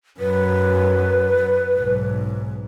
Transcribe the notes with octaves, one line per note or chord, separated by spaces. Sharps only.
F#2 B4
B1 G#2